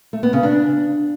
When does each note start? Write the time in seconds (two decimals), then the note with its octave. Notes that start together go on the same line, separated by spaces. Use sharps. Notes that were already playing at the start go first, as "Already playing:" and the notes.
0.13 A3
0.23 B3
0.33 C#3
0.43 D4